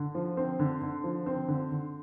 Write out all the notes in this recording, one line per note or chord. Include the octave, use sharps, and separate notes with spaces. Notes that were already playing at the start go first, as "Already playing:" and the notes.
Already playing: D3
F3
C4
D3
D3
F3
C4
D3
D3